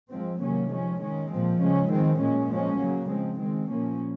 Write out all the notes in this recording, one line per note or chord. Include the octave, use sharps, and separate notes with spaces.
F3 G#3 C4
C3 D#3 F#3 A#3 C#4
F3 G#3 C#4
D#3 G#3 C#4
A#2 F3 C4
C#3 G#3 C#4
D#3 G#3 C4
A#2 G#3 C#4
F3 G#3 C#4
C#3 F#3 A#3
F3 G#3 C4
D#3 G#3 C4
A#2 F3 A#3 C#4